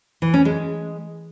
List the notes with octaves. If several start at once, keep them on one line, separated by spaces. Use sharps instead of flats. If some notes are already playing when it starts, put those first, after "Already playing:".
E3
C#4
G#3